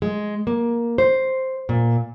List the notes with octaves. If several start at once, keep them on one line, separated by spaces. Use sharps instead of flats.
G#3
A#3
C5
A#2